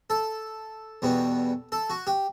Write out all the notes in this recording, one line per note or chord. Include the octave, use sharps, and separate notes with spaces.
A4
E2 B2 G3 B3
A4
F#4
G4